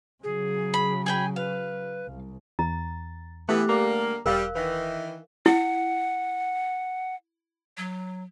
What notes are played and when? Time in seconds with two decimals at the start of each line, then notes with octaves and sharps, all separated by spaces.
0.24 C#3 F#3 G#4
0.74 B5
1.06 G#4 G5 G#5 B5
1.36 B4 F5
2.05 C2
2.59 E2 A#5 A6
3.49 E3 A3 B3 G4 F#6
3.69 D3 G3 A#3 A#5 D6
4.26 E1 G3 A#4 F5 F#6
4.55 D#3 E3 B4 E5 A#6
5.46 E4 F#5
7.77 F#3